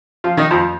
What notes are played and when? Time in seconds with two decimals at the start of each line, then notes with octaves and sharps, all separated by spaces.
0.24 F3 F4
0.37 D#3 D#4
0.51 F2 F3